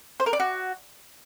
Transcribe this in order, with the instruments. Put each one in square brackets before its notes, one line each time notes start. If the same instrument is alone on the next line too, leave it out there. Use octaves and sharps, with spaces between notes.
[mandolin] C5
A#4
D5
F#4